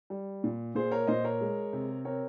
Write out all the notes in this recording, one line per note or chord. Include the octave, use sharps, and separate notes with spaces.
G3
A#2
A#2 G#4 C5
A#4 C#5
A#2 C5 D#5
A#4 C#5
G#3
C3
C4 A#4 C#5